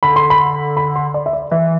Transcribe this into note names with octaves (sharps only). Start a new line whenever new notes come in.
D3 B5
C6
B5
B5
C6
D5
E5
D5
E3 E5